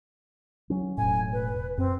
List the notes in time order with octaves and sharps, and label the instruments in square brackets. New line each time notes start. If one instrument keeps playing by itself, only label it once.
[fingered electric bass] F#3 C#4
[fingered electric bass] E1 A2 [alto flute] G#5
[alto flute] B4
[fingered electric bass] F#2 [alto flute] C4